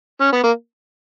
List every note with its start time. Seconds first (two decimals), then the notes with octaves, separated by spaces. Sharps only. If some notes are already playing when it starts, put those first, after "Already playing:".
0.20 C#4
0.32 B3
0.44 A#3